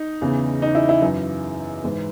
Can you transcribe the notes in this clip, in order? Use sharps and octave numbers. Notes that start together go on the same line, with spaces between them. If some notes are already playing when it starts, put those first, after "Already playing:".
Already playing: D#4
E2 C#3 E3
D#4
E4
E4
F#2 E3
G#2 E3